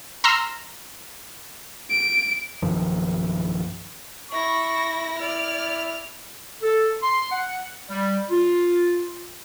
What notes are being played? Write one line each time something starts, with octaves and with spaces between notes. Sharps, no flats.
A#5 C6 E6 F6
D7
B1 G2 D#3 F3
E4 C#6 A#6
E4 D5 F6
A4
C6
F#5
G3
F4